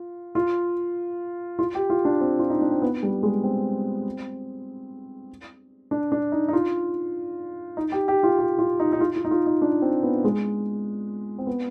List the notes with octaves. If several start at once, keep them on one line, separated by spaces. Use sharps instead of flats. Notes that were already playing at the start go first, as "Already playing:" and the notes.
Already playing: F4
F4
F4
G4
F4
D4
C4
F4
D#4
D4
C4
B3
G3
G#3
C4
D4
D4
D#4
D#4
F4
D#4
G4
G4
F4
G4
F4
D#4
D#4
F4
F4
D#4
F4
D#4
D4
C4
B3
G#3
C4
B3